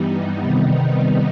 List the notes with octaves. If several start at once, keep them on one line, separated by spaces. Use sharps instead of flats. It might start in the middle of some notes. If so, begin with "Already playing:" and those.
Already playing: G2 E3 G3 B3 D#4
C3 D#3 G3 B3 D#4